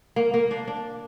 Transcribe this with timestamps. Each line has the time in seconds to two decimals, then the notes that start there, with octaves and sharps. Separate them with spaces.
0.16 A#3
0.34 A#3
0.51 D4
0.68 D4